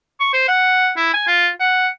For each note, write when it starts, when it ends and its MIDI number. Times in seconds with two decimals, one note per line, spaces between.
0.20 0.31 85
0.33 0.44 72
0.48 0.91 78
0.97 1.14 64
1.14 1.26 80
1.27 1.49 65
1.60 1.88 78